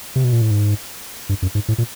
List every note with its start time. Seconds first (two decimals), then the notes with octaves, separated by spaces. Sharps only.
0.16 C3
0.24 B2
0.33 A#2
0.42 A2
0.51 G#2
1.29 G2
1.42 F#2
1.55 G#2
1.68 A2
1.78 A#2